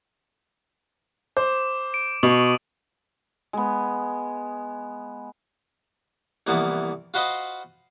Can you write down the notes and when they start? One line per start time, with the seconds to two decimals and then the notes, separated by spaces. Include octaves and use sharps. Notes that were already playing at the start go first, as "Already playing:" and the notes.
1.37 C5 D6
1.94 D7
2.23 B2 C#6 D#6 F#7
3.53 G#3 B3
6.47 C2 E3 F3 A#3 B3 A5
7.14 F4 F#4 B4 C5 D#5 F5